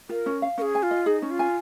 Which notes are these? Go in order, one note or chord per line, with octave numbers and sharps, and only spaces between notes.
F4 A#4
C#4
F5
C#4 G#4 A#4
G#5
F4
D#5
D#4 G#4
C#4
F4
G#5